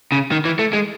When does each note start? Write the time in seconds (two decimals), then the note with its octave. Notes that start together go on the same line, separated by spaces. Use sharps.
0.12 C#3
0.32 D#3
0.45 E3
0.59 A3
0.73 G#3